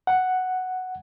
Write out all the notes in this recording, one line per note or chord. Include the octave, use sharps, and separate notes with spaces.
F#5